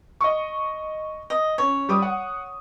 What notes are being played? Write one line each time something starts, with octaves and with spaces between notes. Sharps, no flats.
D#5 C#6
D#5
C#4 C#5
G3 D6 D#6
F#5